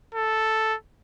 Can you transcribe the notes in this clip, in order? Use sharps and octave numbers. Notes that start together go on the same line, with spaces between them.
A4